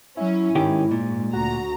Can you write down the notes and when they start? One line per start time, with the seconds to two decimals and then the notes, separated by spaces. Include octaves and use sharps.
0.17 F#3 C#4 E4
0.55 G#2 D#3 C#4 G4
0.91 A#2
1.33 D2 F#4 A#5